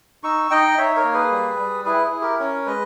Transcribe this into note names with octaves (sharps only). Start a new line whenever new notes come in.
D#4 C#6 E6
D#4 D#5 G5
D#4 C#5 E5
A#4 C#5
A#3
G#4 B4
G3
G3
E4 G#4 B4
G#4
E4
G4 A#4
C#4 A#4 C#5
G#3 B4 D#5